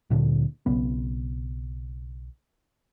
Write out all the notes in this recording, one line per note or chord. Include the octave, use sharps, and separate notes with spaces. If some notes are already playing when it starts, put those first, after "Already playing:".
D2 A#2 D3
B1 C#3 B3